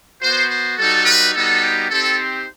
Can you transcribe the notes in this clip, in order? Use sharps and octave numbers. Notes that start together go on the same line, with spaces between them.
B3 F#4 C5
C5
G3 D#4 F#4 A4
B4
G3 B3 D#4 F#4 A4
G4
C4 D#4 G4 A4
C5